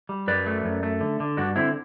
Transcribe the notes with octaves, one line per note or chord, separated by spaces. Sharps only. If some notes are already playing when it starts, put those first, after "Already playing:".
G3
F#2 B4 D5
A3
F#2
A3
D3
D3
G2 D4 F#4
D3 C4 E4